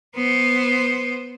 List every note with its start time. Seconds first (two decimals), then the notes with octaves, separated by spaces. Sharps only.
0.16 B3 C5